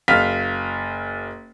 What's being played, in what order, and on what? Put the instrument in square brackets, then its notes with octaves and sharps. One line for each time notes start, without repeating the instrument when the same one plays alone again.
[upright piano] F#1 F5 F6 B6